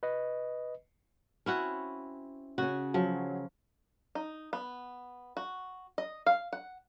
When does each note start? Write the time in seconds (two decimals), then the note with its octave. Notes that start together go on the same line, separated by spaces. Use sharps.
0.03 B4 D#5
1.46 C4 C#4 E4 F#4
2.58 C#3 C#4 F#4
2.94 F3 F#3
4.15 D#4
4.53 B3
5.37 F#4
5.98 D#5
6.26 F5
6.53 F#5